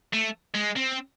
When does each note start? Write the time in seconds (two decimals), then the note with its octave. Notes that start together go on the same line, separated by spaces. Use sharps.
0.13 A3
0.55 G#3
0.77 C4